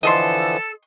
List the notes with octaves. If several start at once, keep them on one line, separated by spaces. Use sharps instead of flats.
D3 E3 F3 A4 D#5 C6